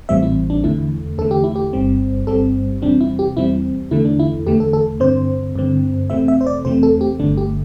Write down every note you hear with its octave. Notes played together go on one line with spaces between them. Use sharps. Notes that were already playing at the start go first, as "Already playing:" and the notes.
A1 A2 E3 G3 C4 E5
E4
D4
E2 D3 A3 E4
E2 D3 A3 A4
G4
E4
G4
G1 G2 G3 C4
G1 G2 G3 C4 A4
E2 C3 G3 C4 D4
E4
G4
E2 C3 G3 C4 E4
E2 D3 A3 E4
D4
E4
E2 D3 A3 G4
A4
A4
G2 D3 C4 C5
G2 D3 C4
E2 C3 A3 C4 E5
E5
C5
D5
E2 C3 A3 C4 C5
A4
G4
G1 G2 D3 A3 D4
G4